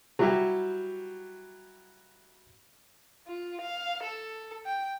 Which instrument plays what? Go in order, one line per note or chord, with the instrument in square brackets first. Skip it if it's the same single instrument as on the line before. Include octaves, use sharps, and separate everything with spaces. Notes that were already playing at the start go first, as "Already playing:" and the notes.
[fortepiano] F#3 G3 E4 F#4 G4
[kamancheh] F4
F5
A4
G5